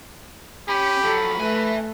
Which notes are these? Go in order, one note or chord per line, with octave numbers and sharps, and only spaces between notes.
C#4 G4 B5
F3 F#3 A4
A3 B4 E5 G#5